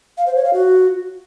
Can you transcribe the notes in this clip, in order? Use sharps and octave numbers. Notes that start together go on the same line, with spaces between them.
F5
C5
C#5
F5
F#4